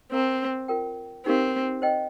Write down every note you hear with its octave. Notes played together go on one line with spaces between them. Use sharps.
C4 A#4 F5 A#5
F4 A#4 G5
C4 D#4 G4 A#4 F5
C5 D#5 G5